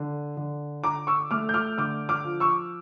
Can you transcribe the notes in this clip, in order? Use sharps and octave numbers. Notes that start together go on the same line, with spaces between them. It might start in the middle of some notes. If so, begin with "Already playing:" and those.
Already playing: D3
D3
D3 A#5 D6
C#6 E6
A3 D6 F6
G6
D6 F6
D3 D6 F6
D6 F6
F3
C#6 E6